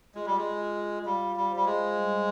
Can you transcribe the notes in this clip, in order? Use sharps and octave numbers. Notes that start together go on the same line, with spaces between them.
G#3 F4
G3
G#3
F4
G3 F5
G3
C5
G3
G#3
G3